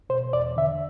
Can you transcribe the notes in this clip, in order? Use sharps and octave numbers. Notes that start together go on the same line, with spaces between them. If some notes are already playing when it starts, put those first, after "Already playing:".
B2 C5
E2 D5
D3 E5